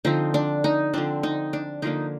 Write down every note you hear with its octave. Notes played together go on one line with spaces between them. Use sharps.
D3 F3 C4 D#4
D4
D#4
D3 F3 C4 D4
D#4
D4
D3 F3 A#3 D4 D#4